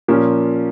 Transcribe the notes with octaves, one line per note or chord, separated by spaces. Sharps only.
A#2 F3 A#3 C#4